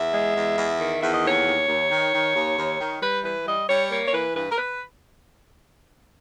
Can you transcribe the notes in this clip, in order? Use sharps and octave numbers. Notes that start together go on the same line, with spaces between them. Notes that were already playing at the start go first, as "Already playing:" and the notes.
Already playing: E2 E5
G#3
E2
E2
D#3
E2 E5
D#5
D#2 C#5
D#2
D#2
D#3
D#3
D#2
D#2
D#3
G3 B4
E3 B4
G3 D#5
G3 C#5
A#3 C#5
C#5
E3 B4
G2 B4
A#4
B4